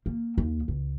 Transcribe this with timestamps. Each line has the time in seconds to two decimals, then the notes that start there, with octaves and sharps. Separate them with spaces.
0.06 A#3
0.38 D#2
0.68 C#2